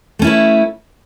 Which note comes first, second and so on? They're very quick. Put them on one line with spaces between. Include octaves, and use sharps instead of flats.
A3 C#4 E4 B4